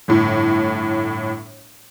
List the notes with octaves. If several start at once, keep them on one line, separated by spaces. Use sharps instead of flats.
G1 A2